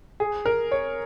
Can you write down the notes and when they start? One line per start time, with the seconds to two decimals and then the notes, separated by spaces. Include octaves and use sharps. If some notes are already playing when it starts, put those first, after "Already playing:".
0.20 G#4
0.46 A#4
0.72 C#5